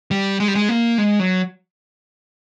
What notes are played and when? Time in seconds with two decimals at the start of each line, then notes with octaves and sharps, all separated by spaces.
0.11 G3
0.40 G#3
0.48 G3
0.55 G#3
0.69 A#3
0.98 G#3
1.19 F#3